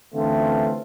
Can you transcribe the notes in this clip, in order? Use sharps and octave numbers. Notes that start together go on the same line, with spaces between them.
D3 E3 A3 C4 C#4 F4